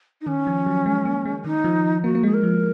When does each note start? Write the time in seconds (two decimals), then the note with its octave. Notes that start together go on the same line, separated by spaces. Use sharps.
0.21 D#4
0.27 D#3 C#4
0.47 F3
0.66 F#3
0.86 G#3
1.05 A#3
1.25 G#3
1.45 D#3 D#4
1.64 F3
2.04 A#3 F#4
2.15 A#3
2.23 G#3 G#4
2.34 A#4
2.43 F3